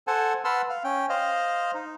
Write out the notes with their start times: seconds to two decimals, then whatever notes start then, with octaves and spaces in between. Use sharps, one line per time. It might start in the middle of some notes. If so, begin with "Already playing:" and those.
0.07 A4 C5 F#5 G#5 A5
0.45 B4 F#5 A5 C6 E6 F6
0.70 F5
0.84 C#4 G5
1.09 C5 D#5 F5
1.74 D#4